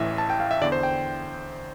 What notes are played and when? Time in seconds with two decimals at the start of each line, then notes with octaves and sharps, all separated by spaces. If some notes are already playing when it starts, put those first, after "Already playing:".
Already playing: A1 A2 E3 E5
0.18 A5
0.30 G5
0.40 F5
0.51 E5
0.62 E2 D3 D5
0.72 C5
0.83 G5